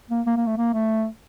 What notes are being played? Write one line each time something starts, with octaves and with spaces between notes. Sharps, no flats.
A#3
A#3
A#3
A3
A#3
A3